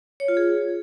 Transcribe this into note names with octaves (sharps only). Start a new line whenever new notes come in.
C#5
F4
G#4